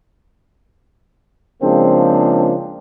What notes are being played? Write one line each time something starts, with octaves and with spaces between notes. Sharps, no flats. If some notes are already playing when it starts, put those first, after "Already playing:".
C#3 F3 G#3 A#3 C4 D4